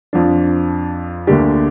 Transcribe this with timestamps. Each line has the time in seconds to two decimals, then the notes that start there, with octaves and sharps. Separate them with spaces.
0.13 F2 F3 D4
1.27 D2 D3 A#3 D4 G4